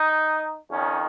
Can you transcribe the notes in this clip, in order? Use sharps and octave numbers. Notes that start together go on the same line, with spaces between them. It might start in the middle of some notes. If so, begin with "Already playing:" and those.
Already playing: D#4
F2 D#3 C#4